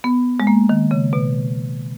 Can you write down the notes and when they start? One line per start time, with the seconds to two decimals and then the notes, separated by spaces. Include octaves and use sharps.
0.04 B3
0.40 G#3
0.47 A#3
0.69 D#3
0.91 C#3
1.13 B2